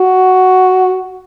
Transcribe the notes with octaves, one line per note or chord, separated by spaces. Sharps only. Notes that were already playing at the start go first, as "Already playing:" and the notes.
Already playing: F#4